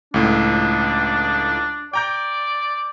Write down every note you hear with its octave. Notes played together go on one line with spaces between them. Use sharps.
C#2 A2 D4
D5 G5 A#5 G6